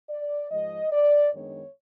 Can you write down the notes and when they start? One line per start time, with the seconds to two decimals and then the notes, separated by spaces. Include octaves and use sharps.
0.10 D5
0.51 G#2 F3 G#3 D#5
0.93 D5
1.34 F#2 D#3 G#3 B3 D4 C#5